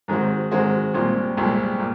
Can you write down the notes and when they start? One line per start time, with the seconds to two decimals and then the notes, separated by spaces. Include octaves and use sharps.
0.08 G#2 D#3 G#3 C4 F#4
0.51 G#2 D#3 G#3 C4 F#4
0.94 C2 A#2 G#3 C4 F4
1.37 C2 A#2 G#3 C4 F4
1.79 A#2